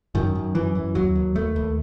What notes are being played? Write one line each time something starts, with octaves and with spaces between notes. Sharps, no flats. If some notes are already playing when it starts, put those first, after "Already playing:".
F#2 D#3
F#2
F#2 E3
F#2
D#2 F#3
D#2
D#2 A3
D#2